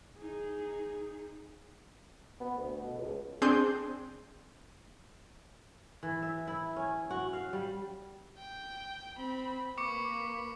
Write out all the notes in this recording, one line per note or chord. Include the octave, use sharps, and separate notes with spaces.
D#4 G#4
B3
D2
B2
C#2
C4 D4 G#4 C6 G6
E3
E5
E4
C#4
F#4
F5
G3
G5
C4 B5
A#3 B4 C#6 D6 C#7